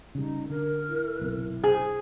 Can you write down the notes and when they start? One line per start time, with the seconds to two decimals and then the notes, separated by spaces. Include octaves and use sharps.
0.15 C#3 G3 D#4
0.50 D3 A#4
0.91 E4
1.19 F#1 B1 C3
1.64 G#4 C5